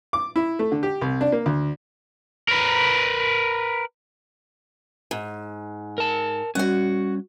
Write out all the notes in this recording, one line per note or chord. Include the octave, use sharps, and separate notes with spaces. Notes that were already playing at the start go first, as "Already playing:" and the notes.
D6
E4
A3
D3
G4
C2
D4
A#3
D2
A#4 B4
G#2
A#4 A5
G3 C#4 F#4 F#5